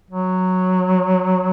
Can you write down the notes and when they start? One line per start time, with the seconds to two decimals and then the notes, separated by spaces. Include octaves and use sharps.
0.10 F#3